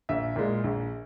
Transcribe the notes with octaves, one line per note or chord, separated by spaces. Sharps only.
A#1 E5
A#2 G#3
A#1